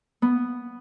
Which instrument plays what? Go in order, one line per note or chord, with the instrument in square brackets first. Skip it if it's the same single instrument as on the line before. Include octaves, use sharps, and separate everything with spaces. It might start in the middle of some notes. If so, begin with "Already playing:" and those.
[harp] B3